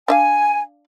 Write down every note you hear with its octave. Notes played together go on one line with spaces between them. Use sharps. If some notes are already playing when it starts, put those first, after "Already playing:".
D4 E5 F5 G#5